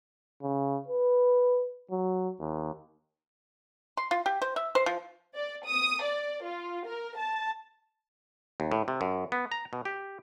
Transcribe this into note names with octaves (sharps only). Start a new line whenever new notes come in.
C#3
B4
F#3
D#2
C6
F4
G4
C5
E5
C5
F3
D5
D#6
D5
F4
A#4
A5
D#2
A2
C3
F#2
B3
A#5
B2
G4